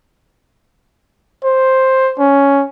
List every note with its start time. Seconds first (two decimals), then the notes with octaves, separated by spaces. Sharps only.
1.44 C5
2.18 C#4